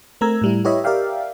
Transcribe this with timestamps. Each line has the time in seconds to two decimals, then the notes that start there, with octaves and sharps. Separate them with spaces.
0.21 A3 C4 A#4 A#5 E6 G#6
0.41 A2 G3 E4
0.65 E4 G4 B4 C#5 D#5 E5
0.84 G4 A#4 D5 E5 F5 G5